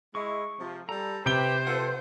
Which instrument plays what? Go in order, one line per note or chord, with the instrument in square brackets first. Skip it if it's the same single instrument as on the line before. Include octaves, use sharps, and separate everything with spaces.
[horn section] G#3 E4 [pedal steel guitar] C#6
[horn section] C3 F3
[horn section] G3 A4 [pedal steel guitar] A#5
[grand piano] C3 D7 G7 [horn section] G4 [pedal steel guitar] B4 B5 G6 [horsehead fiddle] C5
[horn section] F3 C4 A4 [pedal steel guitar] B4 F#5 C6